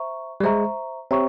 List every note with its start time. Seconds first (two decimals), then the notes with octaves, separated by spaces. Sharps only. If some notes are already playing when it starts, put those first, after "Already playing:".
Already playing: C5 E5 A#5 C#6
0.40 G3
0.43 G#3 C5 E5 A#5 C#6
1.11 C4 G4 C#5 E5 A#5 C#6